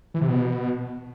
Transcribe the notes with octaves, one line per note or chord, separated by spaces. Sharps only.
E3
C3
B2